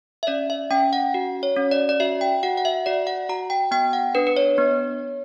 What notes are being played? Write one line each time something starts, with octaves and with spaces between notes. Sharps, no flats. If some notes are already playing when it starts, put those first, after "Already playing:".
E5
C#4 D5
E5
C#4 G5
F#5
F#4
C#5
C#4
D5
D5
F#4 E5
G5
F#4 F#5
F#5
E5
F#4 D5
F#5
F#4 A#5
G5
B3 G5
F#5
D4 B4
B4
C#5
B3